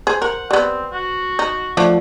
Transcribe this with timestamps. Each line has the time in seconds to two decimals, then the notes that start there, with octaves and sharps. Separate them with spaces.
0.07 G#4 C5
0.22 A#4 F#5
0.51 G3 B3 C4
0.93 F#4
1.39 D#4
1.77 D3 F3 A3 D5